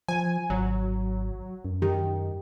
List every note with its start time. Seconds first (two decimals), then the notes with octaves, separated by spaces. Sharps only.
0.08 F3 G#5
0.50 G#1 F#3
1.65 F#2
1.82 D#3 G4